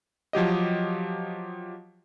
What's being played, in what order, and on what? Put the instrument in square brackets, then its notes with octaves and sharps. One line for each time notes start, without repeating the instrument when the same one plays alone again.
[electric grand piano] F3 F#3 G4 D#5